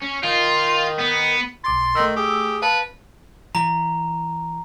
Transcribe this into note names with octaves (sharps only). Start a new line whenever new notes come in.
C#4
D#3 F4
B3
B1 C6 D6 A6
D#3 A3 E6
G4 G#4
B4 F5 A5
E3 A#5